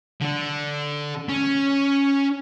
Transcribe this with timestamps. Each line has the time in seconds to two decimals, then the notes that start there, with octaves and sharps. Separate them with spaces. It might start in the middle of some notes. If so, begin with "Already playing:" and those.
0.21 D3 D4
1.29 C#4